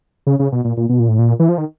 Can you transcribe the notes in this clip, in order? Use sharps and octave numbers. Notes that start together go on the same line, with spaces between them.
C#3
C#3
B2
A#2
A#2
B2
A#2
A2
A#2
E3
F3
D#3